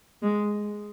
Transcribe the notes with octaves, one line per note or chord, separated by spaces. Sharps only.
G#3